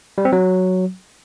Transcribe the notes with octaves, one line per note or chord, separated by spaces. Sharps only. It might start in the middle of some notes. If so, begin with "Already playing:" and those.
G3
C4
F#3